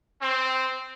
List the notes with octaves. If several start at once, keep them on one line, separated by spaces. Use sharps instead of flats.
C4